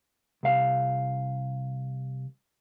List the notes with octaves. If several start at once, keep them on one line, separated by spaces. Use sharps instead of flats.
C2 F5